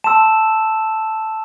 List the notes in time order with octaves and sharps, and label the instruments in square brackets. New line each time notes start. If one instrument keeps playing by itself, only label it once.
[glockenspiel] A5 C6 E6 E7